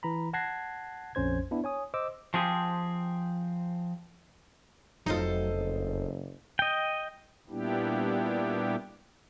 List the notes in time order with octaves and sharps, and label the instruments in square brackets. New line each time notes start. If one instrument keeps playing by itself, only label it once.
[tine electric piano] E3 A#5 B5
F#5 A5 F#6 G#6 A#6 C7
A#1 F2 C#4 C5 G#6
B3 D4 E4
C#5 G#5 D#6
C5 D#5 D6 E6
[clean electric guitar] F3 C4 G4 G#4
[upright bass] F1 F2 [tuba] F#3 [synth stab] D#4 F4 [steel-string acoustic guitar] A4 C5 D#5
[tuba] F#1
[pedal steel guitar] D#5 G5
[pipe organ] A#2 G3 B3 D4 E4 G4